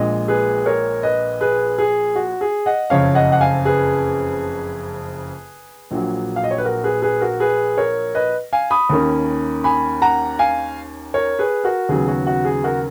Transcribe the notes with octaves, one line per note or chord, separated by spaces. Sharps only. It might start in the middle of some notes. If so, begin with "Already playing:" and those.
Already playing: A#1 A#2 G#3 D#5
G#4 B4
A#4 C#5
B4 D#5
G#4 B4
G#4
F#4
G#4
D#5 F#5
F#1 F2 C#3 C#5 F5
D#5 F#5
F#5
F5 G#5
G#4 B4
A#1 A#2 F#3
F5
D#5
C#5
B4
F#4 A#4
G#4 B4
G#4 B4
F#4 A#4
G#4 B4
A#4 C#5
B4 D#5
F5 G#5
B5 D#6
D#2 D#3 A#3 C#4
G#5 B5
F#5 A#5
F5 G#5
A#4 C#5
G#4 B4
F#4 A#4
D#2 C#3 F#3 B3 G#4
F#4
F#4
G#4
F#4 A#4